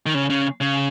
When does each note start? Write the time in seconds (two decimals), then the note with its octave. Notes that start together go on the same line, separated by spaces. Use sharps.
0.06 D#3
0.15 C#3
0.30 C#3
0.61 C#3